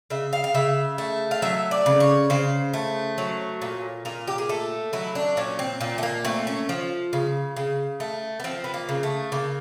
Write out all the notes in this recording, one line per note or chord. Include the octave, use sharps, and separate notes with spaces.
C#3 E5
F5
F5
C#3 E5
A3
F5
F#3 E5
D5
C#3
C#5
C#3 C5
A3
F#3
A#2
A#2 A#4
G4
G#4
A3 A4
F#3 E4
D4
A#2 C#4
C4
A#2 C4
A3
A#3
A3 C4
C#4
F3
C#3
C#3
A3
B3
F3 C4
B3
A#3
C#3
A3
C#3 A#3